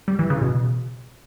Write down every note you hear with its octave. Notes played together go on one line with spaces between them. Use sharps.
G3
E3
C#3
B2